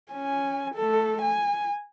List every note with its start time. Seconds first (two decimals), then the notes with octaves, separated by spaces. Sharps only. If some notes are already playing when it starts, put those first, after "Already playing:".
0.12 C#4 G#5
0.75 A3 A4
1.22 G#5